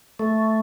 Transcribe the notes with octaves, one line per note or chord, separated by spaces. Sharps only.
A3